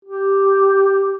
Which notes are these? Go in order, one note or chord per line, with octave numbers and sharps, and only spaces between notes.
G4